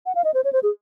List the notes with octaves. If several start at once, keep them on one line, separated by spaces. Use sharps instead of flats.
F#5
F5
D#5
C5
C#5
C5
G#4